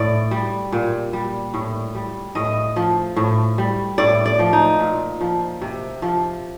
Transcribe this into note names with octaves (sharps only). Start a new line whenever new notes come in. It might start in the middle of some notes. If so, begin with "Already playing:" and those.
Already playing: A2 D5
G3
A#2
G3
A2
G3
A2 D#5
F3
A2
G3
A2 D5
D5
F3
D#4
A#2
F3
C3
F3